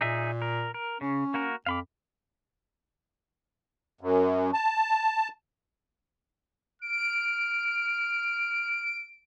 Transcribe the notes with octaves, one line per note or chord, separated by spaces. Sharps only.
A#2 D#4 G#4 E5
A#4
A#4
C#3 C#4
A#3 F#4 A#4
F2 F5 B5 D6
F#2
A5
F6 D7